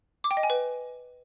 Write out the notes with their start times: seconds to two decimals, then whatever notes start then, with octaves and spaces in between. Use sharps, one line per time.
0.24 D6
0.31 G5
0.37 D#5
0.43 G#5
0.50 B4